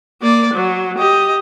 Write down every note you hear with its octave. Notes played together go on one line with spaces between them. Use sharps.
A#3 D5
F#3
G4 D#5